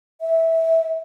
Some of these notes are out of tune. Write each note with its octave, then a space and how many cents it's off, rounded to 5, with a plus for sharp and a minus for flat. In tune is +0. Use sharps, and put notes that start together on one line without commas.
E5 -15